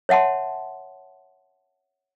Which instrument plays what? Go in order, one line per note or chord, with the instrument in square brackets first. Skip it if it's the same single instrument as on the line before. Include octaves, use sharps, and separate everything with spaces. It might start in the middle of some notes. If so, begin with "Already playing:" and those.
[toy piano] C#5 E5 F#5 A5 C6